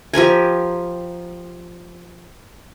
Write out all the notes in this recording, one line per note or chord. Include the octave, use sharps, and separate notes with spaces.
F3 G4 A#4 G#5